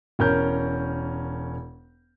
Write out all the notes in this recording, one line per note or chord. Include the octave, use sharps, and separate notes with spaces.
E1 C#4 A#4 G6